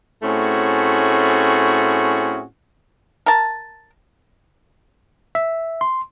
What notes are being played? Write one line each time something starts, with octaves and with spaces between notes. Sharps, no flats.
A2 A3 C4 C#4 F#4 G#4
A#4 A5
E5
C6